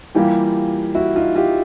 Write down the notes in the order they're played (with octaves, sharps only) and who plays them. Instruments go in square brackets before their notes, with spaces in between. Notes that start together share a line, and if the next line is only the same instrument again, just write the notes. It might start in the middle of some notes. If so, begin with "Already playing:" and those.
[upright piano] E3 G3 A#3 [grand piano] F4 G4
[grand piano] E4 F#4
D#4 F4
F4 G4